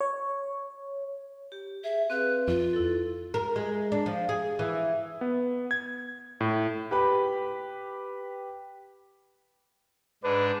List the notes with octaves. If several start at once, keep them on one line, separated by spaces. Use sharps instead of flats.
C#5
G4
G#4 E5
C4 B4 F5 F#6
F2 F4
E4 A4
A#4
G#3
D4
F3
G#4
E3
B3
G#6
A2
G4 B4 B5
G#2 D4 B4